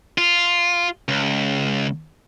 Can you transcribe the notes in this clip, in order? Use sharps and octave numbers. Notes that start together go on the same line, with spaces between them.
F4
C#2